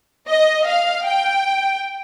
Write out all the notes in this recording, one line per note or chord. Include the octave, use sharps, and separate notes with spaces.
D#5
F5
G5